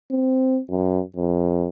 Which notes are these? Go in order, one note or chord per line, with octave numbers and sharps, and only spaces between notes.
C4
F#2
F2